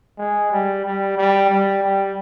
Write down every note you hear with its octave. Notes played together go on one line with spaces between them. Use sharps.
G#3
G3
G3
G3
G3
G3